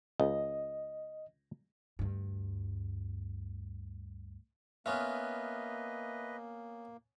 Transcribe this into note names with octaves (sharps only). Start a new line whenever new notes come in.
C#2 D#5
D2 G2
A#3 B3 C#4 F4 B4 D#5 E5